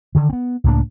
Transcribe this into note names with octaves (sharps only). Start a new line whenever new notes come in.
D3 D#3
B3 C4
C#2 A2 A#3 D4